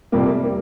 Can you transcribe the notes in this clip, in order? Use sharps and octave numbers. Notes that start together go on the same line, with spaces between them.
F2 C3 G3 A#3
G3 A#3